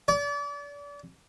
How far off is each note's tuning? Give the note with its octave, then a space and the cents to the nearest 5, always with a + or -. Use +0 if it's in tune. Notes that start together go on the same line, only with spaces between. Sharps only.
D5 -35